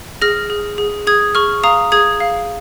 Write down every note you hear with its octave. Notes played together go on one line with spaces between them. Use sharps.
G#4 F6 A#6
G#4
G#4
G#4 D#6 G#6
G#4 C#6 F6
F5 A#5 D#6
G#4 D#6 G#6
F5